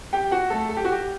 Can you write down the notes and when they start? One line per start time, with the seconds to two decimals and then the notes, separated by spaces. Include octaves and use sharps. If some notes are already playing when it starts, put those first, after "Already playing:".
0.13 G4 G5
0.31 F#4 F#5
0.50 A3 A4
0.69 A4
0.77 G4
0.85 F#4
0.92 G4